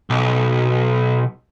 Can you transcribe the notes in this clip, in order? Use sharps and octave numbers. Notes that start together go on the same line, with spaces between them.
B1